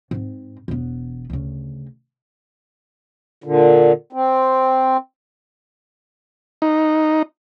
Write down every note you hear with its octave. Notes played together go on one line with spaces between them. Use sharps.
G#2 C4
E1 B3
D2 C#3
A#2 D3
C4
D#4